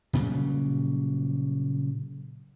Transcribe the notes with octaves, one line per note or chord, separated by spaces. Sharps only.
A#2 C#3 F#3 G3